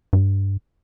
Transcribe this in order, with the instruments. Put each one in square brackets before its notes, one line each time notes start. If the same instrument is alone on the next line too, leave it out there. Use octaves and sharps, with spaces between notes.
[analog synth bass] G2